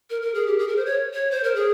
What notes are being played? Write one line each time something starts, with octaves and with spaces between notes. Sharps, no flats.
A#4
A#4
G#4
G4
G#4
A#4
C5
C#5
C#5
C5
A#4
G#4